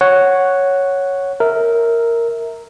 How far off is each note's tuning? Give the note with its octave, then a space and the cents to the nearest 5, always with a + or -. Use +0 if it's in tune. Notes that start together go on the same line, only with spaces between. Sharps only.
C#5 +0 F#5 +0
A#4 -5 E5 -25